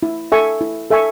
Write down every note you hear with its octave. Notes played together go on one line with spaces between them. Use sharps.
E4
A4 E5 G#5 C#6
E4
A4 E5 G#5 C#6